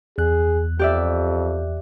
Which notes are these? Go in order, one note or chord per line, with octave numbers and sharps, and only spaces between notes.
E2 G#4 F#6
F2 G4 D5 E5